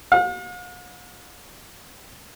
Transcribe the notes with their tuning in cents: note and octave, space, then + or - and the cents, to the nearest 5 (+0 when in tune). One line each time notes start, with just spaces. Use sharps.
F5 +45